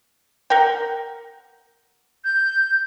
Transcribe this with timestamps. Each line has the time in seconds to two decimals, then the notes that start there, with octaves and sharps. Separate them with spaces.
0.50 A#4 F#5 G5
2.24 G6